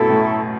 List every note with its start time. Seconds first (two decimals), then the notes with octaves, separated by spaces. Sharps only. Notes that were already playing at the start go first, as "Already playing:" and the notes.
Already playing: F#2 B2 A3 E4 A4
0.09 A2